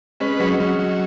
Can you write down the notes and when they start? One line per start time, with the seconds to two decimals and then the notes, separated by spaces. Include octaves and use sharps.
0.20 G#3 C#4 B4
0.40 F#3 G#3 C#4
0.60 F#3 G#3 C#4
0.79 F#3